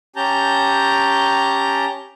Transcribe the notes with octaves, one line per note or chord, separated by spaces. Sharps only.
C#4 G4 A5 A#5 G6